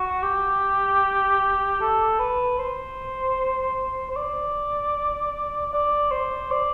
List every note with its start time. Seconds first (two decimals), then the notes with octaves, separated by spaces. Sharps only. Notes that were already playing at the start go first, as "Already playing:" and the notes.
Already playing: F#4
0.24 G4
1.81 A4
2.19 B4
2.59 C5
4.11 C5
4.16 D5
5.73 D5
6.11 C5
6.51 D5